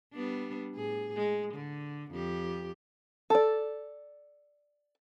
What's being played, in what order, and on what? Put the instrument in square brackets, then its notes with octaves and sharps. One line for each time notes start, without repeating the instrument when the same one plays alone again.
[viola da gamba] G3 B3 D4
A2 G#4
G#3
D3
F2 G4
[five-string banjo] A4 D5